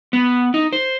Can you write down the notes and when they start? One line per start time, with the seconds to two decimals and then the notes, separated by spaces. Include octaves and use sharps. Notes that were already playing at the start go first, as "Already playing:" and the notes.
0.13 B3
0.54 D#4
0.73 C5